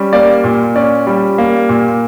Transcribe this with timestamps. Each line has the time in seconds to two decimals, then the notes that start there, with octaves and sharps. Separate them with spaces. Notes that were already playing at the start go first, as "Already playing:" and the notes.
Already playing: G3 C#4
0.13 A#3 D5
0.44 A#2
0.76 C#4 D5
1.07 G3
1.38 A#3
1.69 A#2